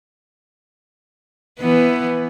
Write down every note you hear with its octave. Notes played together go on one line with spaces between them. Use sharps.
E3 B3